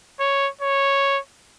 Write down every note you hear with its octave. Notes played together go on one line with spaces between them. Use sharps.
C#5
C#5